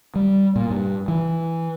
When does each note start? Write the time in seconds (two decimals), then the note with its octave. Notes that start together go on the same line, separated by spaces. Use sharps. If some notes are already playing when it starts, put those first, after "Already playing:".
0.16 G3
0.56 A#2
0.70 G2
1.08 E3